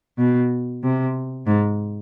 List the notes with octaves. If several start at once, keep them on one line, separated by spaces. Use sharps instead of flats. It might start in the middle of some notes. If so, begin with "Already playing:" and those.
B2
C3
G#2